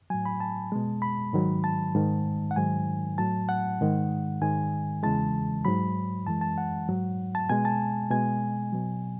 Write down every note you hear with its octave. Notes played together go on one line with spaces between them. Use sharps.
A2 F#3 G#5
B5
A5
B2 G#3
B5
G#2 D#3 F#3
A5
G#2 D#3 G#3
F#5
G#2 D#3 F#3 G#5
A2 F#3 A5
F#5
G#2 D#3 G#3
G#2 D#3 G#3 G#5
E2 C#3 E3 G#3 A5
G#2 F#3 B5
F#2 E3 G#3 A5
A5
F#5
G#2 F#3
A5
B2 G#3 G#5
A5
B2 G#3 G#5
B2 F#3